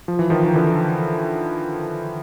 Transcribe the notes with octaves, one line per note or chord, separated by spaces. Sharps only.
F3
E3
D#3 F3
D#3
D3 E3